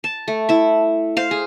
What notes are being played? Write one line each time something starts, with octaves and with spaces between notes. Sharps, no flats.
A5
A3
E4 E5
C5 F5
G#4